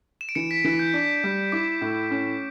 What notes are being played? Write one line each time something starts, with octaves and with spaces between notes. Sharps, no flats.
E7
D7
E3 C#7
B6
E3
G6
D4
G3
E4 D6
A2
C#4